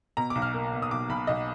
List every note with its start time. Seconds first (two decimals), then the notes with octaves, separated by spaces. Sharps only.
0.17 B2 A#5
0.30 D6
0.35 B1
0.42 F6
0.54 A#3
0.72 B2
0.82 D#6
0.91 B1 D6
1.09 B1 B5
1.27 B1 D#5